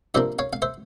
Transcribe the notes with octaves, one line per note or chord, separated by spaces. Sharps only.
G2 F3 A#3 C5 E5
C#5 F5
F5
C5 E5